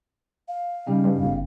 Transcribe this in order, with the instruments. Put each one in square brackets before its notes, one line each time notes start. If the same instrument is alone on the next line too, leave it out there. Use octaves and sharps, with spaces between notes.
[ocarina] F5
[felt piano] C#3 G3 D#4
[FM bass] G2
G1